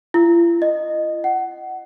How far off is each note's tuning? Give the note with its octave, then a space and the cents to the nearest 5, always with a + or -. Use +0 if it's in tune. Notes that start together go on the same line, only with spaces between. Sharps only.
F4 -45
D#5 -15
F#5 +20